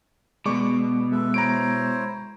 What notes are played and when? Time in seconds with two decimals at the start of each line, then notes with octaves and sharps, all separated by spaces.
0.46 B2 G#3 D5 C#6 D6
1.12 G#3 A4 B4 E5
1.34 E4 C5 C#5 A#5 D7